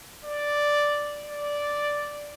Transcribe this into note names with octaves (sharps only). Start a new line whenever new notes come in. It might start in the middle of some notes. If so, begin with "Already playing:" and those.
D5
D5